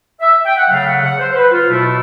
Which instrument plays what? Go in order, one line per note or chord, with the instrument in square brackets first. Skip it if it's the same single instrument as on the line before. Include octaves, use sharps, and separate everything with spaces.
[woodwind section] E5
G5
F#5
C#3 F#3 A3 F5
F#5
F#5
C5
C5
B4
F4
B2 F#3 A3 E4